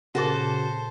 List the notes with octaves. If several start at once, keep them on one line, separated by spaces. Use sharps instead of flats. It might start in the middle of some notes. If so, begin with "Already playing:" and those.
A#2 C#3 F#4 A4 A#4 C5 A5